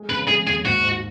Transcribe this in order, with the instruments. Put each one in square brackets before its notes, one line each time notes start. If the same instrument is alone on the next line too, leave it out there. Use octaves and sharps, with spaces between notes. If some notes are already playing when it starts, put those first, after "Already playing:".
Already playing: [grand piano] G#3
[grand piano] C#3 [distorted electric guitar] B4
[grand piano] G#3 [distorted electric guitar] G#4
[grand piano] D#2 [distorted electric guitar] G#4
[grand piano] G#2 [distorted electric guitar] F#4
[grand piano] G#2